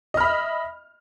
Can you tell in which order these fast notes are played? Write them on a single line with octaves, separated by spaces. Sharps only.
D#5 F6 B5 E5